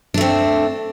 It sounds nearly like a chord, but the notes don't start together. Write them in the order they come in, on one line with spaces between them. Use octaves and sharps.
D4 A3 C4